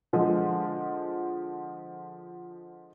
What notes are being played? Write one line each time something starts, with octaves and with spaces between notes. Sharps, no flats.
D3 F3 G#3